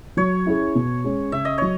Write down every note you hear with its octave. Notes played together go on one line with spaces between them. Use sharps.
F#3 C#5
C#4 E4 G#4
B2
G#3 C#4
C#3 E5
D#5
F#3 C#5